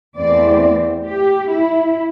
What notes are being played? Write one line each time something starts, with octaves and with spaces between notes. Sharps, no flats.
E2 E3 A3 C4 D5
G4
E4